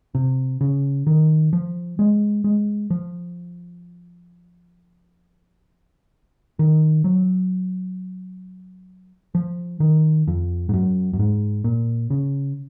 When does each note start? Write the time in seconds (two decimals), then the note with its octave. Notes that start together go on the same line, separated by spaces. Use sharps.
0.15 C3
0.61 C#3
1.07 D#3
1.53 F3
1.99 G#3
2.44 G#3
2.90 F3
6.59 D#3
7.04 F#3
9.35 F3
9.80 D#3
10.28 F2
10.69 G#2
10.74 F#2
11.13 F#2
11.19 G#2
11.64 A#2
12.10 C#3